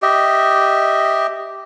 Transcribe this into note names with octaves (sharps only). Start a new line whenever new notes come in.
G4 D#5 E5